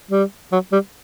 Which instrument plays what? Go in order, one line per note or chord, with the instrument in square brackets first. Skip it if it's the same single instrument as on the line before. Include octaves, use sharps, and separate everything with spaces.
[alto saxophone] G3
F#3
G3